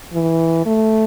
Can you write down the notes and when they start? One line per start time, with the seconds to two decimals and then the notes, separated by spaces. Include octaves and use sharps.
0.13 E3
0.66 A3